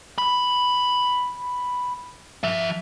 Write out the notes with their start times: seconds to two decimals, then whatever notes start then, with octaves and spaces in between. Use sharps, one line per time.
0.18 B5
2.44 F3 E5